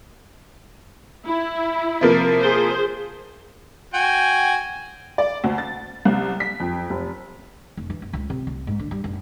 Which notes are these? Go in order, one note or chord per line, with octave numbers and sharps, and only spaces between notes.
E4
C3 F3 A#3
G#4 C5
F#4 G5 G#5
D5
D2
A6
C2
B6
F2
F1
F1
E3
F#1
C#2
C3
C2
G#2
D3
G3
F#1